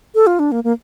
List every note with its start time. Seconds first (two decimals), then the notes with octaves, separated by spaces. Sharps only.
0.15 A4
0.27 F4
0.39 D4
0.52 A#3
0.64 A#3